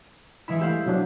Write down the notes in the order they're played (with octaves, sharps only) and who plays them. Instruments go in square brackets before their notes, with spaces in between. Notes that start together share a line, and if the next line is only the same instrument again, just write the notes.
[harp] E3 G#3 E4 [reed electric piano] E5 B5
[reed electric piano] G3 A3 G4 [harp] E4 C5 F5
[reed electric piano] B2 F#3 D4